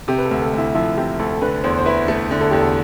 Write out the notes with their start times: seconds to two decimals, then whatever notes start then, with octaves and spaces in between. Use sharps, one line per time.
0.08 C3 G4
0.18 B4
0.25 A4
0.31 D2
0.42 A4
0.53 D2
0.58 E4
0.75 F3 E4
0.97 C3 G4
1.19 D2 A4
1.42 D3 B4
1.63 E2 C5
1.78 C5
1.86 E4 B4
2.08 A3 A4
2.31 D3
2.41 A4
2.51 E2 G4
2.61 A4